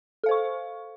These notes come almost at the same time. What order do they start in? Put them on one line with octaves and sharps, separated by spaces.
A4 F5 C5 C#6